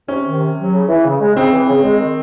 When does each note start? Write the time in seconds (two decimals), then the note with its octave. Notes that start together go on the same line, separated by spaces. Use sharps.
0.08 C3 C#4
0.24 D#3
0.40 C3
0.57 F#3
0.73 C#3
0.88 E3
1.05 C#3
1.20 G#3
1.35 C#3 C4
1.52 E3
1.68 C#3
1.83 G#3
2.00 D#3